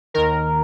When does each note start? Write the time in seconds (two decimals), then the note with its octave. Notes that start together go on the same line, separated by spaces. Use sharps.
0.14 D#2 D#3 A#4